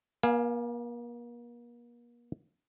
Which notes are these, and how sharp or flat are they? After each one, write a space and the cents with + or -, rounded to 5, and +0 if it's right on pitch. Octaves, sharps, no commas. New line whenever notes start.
A#3 +40 F5 +0 G#5 +0